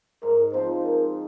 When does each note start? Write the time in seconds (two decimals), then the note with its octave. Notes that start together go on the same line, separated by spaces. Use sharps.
0.23 G#2 A#4
0.53 F3 C4 D#4 C5
0.84 G#3 A#4